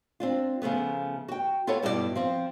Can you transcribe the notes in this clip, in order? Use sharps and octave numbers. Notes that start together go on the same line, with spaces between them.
C4 D4 F4
C#3 F3 A3 B3
F#4 G5
F4 A4 B4 C#5 F#5
G2 B2 G3 E4 G4 D5
F3 C4